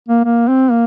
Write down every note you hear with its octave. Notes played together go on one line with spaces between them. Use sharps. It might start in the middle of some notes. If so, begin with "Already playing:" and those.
A#3
A#3
C4
A#3